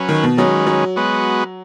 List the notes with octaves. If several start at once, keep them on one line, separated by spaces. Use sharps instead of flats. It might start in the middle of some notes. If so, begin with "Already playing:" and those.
Already playing: F#3 C#4 B4
D#3
B2
D#3 F#3 G#3 C#4 B4
F#3
G#3 B3 F#4 B4